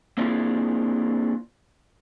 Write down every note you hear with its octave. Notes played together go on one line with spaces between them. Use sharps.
A#3 C4 D4 E4 F4 G#4